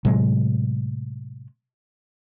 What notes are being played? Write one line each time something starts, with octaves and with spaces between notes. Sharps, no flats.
A2 C3 F#3 G#3